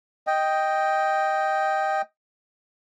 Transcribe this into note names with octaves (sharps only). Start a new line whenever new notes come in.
D#5 G5